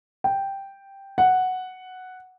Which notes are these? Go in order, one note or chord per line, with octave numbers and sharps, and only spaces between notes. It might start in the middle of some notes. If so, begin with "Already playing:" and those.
G5
F#5